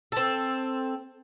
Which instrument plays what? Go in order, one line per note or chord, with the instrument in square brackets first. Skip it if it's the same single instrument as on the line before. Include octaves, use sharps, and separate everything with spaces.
[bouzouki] C4 A4